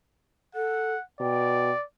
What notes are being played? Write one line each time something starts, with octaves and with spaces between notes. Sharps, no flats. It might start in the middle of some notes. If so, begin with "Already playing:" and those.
A4 F#5
B2 D5 G5